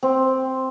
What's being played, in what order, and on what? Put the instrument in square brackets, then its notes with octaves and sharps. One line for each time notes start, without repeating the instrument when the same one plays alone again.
[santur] C4